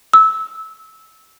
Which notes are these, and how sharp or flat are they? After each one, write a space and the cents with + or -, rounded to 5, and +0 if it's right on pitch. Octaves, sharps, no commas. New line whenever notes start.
E6 -20